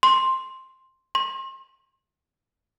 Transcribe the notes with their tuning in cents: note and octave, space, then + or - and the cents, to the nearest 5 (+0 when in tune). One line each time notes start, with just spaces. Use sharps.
C6 +5
C6 +35